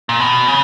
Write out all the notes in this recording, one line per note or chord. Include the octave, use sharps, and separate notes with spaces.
A#2
B2
C#3